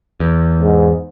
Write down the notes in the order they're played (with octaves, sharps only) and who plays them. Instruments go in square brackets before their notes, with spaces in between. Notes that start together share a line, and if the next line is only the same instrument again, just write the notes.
[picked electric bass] E2
[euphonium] G#2